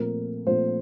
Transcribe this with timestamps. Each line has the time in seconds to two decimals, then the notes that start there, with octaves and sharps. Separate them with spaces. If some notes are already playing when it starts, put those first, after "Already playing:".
Already playing: A#2 F3 A3 C4 A#4
0.47 A#2 F3 A3 C4 C5